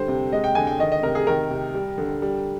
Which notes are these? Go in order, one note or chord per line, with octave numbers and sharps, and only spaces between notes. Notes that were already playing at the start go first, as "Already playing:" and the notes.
Already playing: D3 G3 C5
C3
G#3 D#5
G5
D3 G#5
G5
D#3 D#5
D#5
C3 A#4
G#4
D#3 A#4
C3
G3
D3
G3